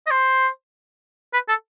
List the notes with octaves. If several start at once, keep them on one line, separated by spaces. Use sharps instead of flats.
D#5
C5
B4
A4